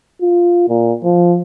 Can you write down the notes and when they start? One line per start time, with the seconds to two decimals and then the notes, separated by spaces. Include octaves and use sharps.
0.22 F4
0.69 A#2
1.04 F3